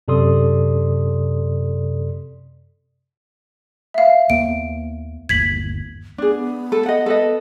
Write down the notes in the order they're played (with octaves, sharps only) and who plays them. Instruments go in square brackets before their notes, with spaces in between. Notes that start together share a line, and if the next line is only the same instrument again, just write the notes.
[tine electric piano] F#2 C3 A4 D5 C6 D#6
[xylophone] E5 F5
[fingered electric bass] D#2 A#3 B3 [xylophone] D7
[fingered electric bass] G1 D#2 [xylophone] G#6 B6 F#7
[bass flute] B3 [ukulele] D4 G#4
[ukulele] A4
D#5 F#5
A4 B4 D#5